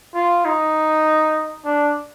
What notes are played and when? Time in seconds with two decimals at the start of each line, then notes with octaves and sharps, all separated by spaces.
0.15 F4
0.45 D#4
1.65 D4